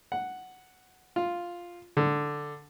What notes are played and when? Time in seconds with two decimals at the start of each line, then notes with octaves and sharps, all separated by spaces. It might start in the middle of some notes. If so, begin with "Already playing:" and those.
0.12 F#5
1.16 F4
1.97 D3